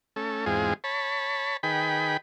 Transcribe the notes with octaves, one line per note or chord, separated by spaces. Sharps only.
A3 C#4 A4
E2 G#2 G#3 C4 F4 G#4
C#5 A5 B5
D#3 G#4 B4 G5 B5